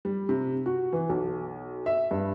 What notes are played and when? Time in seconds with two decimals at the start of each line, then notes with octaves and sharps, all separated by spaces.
0.05 G3
0.29 C3
0.66 F#4
0.93 E3
1.09 B1
1.86 E5
2.11 G2